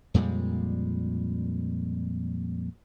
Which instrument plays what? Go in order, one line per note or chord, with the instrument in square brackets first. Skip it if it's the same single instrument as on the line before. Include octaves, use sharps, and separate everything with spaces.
[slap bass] F2 A#2 G3 G#3